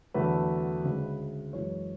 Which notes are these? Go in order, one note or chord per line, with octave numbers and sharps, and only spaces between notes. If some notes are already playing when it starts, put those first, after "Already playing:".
E2 D3 F#3 A3 B4
D2 C#3 G#3
F#2 E3 G#3 C#5